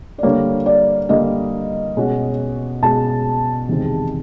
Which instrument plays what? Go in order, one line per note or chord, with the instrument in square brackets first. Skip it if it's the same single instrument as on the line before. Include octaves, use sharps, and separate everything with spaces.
[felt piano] D5
[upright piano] D3 G3 A#3 [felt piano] C#5
[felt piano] D5
[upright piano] D3 G3 A#3 [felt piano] D#5
[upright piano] B2 G#3 C#4 F#4
[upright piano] B2 G#3 C#4 F#4 [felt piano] A5
[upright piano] E2 C3 D#3 G#3 C4